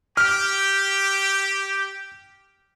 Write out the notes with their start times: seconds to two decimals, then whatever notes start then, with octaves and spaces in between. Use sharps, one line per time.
0.17 G4 F6